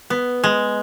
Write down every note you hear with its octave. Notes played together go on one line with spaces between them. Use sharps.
B3
G#3